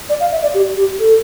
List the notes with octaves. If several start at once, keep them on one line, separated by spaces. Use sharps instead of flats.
D5
F5
E5
D5
G4
G4
A4